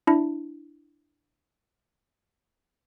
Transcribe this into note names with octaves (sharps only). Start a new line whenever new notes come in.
D4 E4